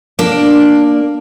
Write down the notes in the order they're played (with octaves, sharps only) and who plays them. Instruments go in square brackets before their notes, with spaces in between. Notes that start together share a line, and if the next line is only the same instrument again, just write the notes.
[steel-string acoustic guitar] A#3 [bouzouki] D4